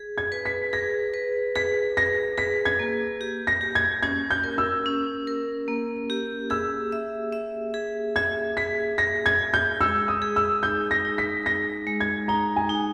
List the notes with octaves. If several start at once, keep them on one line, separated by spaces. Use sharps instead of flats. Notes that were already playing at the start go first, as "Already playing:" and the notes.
Already playing: G#4
G#6
B4
B6
G#4 A#6
B4
G#4 B6
G#4 A#6
G#4 B6
G#6
A#3
G4
A#6
G4
G#6
C#4 G#6
G6
A#4
E6
C#4
A#4
A#3
G4
G#4 E6
E5
E5
G#4
E5 G#6
G#4 B6
G#4 A#6
G#6
G#4
G6
G#3 E6
D#6
G#4
E6
D#4 G6
A#6
D#4
B6
D#4 A#6
G#3
G#6
D#4 A#5
G#5
D#4